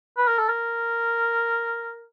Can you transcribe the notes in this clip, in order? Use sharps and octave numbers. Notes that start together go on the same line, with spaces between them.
B4
A#4
A4
A#4